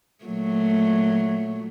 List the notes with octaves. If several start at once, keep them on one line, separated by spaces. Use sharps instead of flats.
A#2 F#3 A3